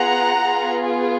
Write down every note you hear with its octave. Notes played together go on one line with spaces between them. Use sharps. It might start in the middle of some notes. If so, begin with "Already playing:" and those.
Already playing: B3 F4 G#4 F#5 A#5
B3 F4 G#4